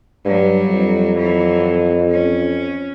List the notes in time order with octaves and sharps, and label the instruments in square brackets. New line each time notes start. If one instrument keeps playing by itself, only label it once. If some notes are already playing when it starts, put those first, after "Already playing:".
[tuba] G2 [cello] F#3 G3
[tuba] F2
[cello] E3 F#3
C#4